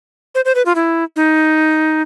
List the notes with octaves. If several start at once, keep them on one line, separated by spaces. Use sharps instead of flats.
C5
C5
B4
F4
E4
D#4